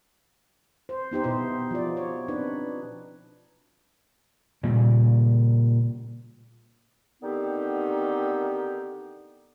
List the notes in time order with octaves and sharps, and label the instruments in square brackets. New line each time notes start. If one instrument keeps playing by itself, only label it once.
[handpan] C5
B3 D#4 G4 C5
B2 E4 C5
F3 D5
C#5
C4 D4 D#4 B4
[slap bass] A#2 C#3 G3
[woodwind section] D3 D#3 B3 C4 D#4 G4